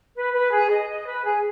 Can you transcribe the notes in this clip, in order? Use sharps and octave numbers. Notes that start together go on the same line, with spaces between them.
B4
B4
G#4
D#5
D#5
B4
G#4